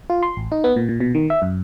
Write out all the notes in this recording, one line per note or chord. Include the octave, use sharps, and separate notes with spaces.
F4
C6
A1
D#4
B3
A#2
A#2
B2
D#3
E5
F#2